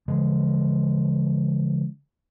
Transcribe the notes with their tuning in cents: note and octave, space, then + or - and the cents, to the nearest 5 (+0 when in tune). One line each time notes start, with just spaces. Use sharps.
D3 -45 F3 -40 G#3 +0